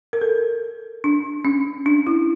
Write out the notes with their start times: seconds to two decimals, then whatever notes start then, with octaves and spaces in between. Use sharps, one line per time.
0.13 A#4
0.22 A4
1.04 D4
1.45 C#4
1.86 D4
2.07 E4